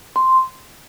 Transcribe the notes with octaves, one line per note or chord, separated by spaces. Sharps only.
C6